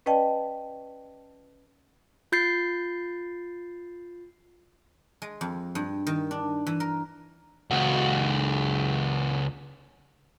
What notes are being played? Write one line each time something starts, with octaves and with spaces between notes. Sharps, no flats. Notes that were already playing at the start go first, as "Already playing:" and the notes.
C#4 B4 D5 D#5 G5 A5
F4 G6 A6 C7
G#3
F2
G2
D#3
D4
E3
A#4
C#2 F#4